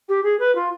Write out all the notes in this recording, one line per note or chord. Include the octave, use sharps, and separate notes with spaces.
G4
G#4
B4
F4